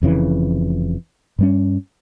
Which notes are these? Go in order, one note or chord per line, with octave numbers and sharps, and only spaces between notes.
F1 F2 C#3 E3
G2 G3 C#4